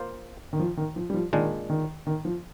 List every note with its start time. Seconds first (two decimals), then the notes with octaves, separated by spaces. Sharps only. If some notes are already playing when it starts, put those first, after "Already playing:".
Already playing: A#3 F4 C5
0.53 D#3
0.59 F3
0.77 D#3
0.96 F3
1.10 G3
1.14 F3
1.33 A#2 D#3 G#3 D4
1.70 D#3
2.07 D#3
2.25 F3